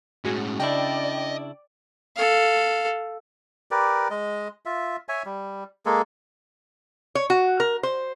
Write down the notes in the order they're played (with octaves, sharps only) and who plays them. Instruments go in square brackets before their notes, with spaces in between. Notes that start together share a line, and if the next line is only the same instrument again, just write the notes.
[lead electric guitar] A2 G#3 [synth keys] C#4 F#4 G#4
[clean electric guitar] C#3 D4 E4 [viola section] D5 [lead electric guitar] D#5 [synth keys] G5
[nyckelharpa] A4 F5
[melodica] G4 A#4 B4 D5
G#3 D#5
F4 E5
C#5 E5 G#5
G3
G#3 A#3 G#4 A4
[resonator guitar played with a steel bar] C#5
F#4
A#4
C5